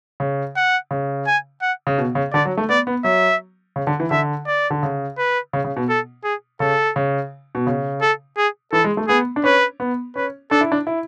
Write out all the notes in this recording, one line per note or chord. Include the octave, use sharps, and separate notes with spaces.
C#3
F#5
C#3
G#5
F#5
C#3
B2
C#3
D3 D5
F#3
A3
B3 D5
B3
F#3 E5
C#3
D3
E3
D3 E5
D5
D3
C#3
B4
C#3
C#3
B2
A4
G#4
C#3 A4
C#3
B2
C#3
A4
G#4
E3 A4
G#3
A3
B3 G#4
D4
C#4 B4
B3
C#4 B4
D4 A4
E4
D4
E4